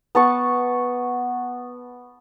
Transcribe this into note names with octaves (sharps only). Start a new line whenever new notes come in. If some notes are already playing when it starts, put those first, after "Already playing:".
B3 A5 C#6